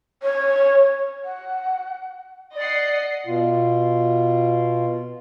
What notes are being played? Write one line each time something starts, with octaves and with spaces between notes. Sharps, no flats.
C#5
F#5
D5 D#5 F#5 C7
B2 F4